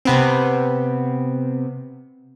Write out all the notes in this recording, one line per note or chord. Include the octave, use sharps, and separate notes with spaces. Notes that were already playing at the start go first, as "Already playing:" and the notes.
C3 B3 C4